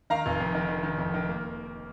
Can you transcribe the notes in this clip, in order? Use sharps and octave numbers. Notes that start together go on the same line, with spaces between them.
D#3 F5 A#5
F1
F2
D#3
D#3
D#3
F2
D#3
A#3